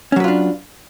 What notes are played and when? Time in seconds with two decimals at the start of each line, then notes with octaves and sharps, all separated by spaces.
0.12 C#4
0.16 F#3
0.20 B4
0.24 F4
0.28 D4